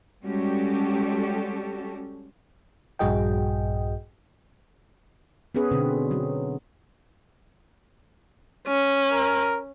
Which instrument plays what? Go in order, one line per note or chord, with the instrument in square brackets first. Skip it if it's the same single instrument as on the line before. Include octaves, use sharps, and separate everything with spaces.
[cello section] G3 G#3 C#4 F#4 G4 A4
[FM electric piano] A#1 G2 F#4 G#4 D#5 G5
[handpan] B3 C#4 G#4 B4
B2 D3 C4
F#3
[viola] C#4
[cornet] A#4